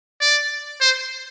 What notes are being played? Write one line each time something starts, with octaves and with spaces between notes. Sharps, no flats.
D5
C5